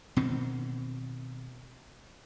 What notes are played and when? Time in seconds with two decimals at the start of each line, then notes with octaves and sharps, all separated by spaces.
0.17 B2 D#3 C4